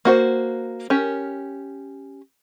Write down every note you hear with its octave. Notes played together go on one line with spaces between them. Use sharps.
A#3 F#4 C5
C#4 G4 A#4